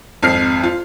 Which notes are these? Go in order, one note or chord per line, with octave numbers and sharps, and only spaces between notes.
G#1 F2 F6 C7
F4